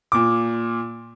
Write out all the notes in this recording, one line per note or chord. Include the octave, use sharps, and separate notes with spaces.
A#2 D6